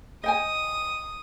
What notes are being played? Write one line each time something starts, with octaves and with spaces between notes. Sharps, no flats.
D#5 G5 G#5 D#6